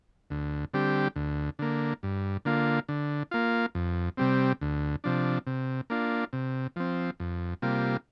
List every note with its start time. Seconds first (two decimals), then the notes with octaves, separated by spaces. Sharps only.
0.30 D2
0.74 D3 G3 C4 G4
1.16 D2
1.59 D3 A#3
2.03 G2
2.45 D3 A#3 F4
2.89 D3
3.31 A#3 F4
3.75 F2
4.17 C3 G3 C4
4.61 D2
5.04 C3 F3 D4
5.47 C3
5.90 A#3 D4 F4
6.33 C3
6.76 F3 C4
7.20 F2
7.62 C3 G3 A#3 F4